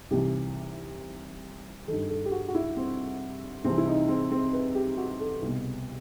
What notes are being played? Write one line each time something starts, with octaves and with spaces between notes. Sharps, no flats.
C2 C3 E3 G4
G2 D#3 A4
A4
G4
F#4
F#4
E4
C4
C2 C3 E3 C4
E4
D#4
C4
C4
B4
G4
F#4
A4
C2 B2